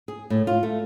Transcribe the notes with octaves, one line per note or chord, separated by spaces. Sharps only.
G#4
A2
F4
A3